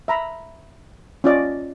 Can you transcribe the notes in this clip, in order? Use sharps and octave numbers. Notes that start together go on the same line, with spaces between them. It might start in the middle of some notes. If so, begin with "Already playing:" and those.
E5 A#5 B5
C#4 F4 D5 D#5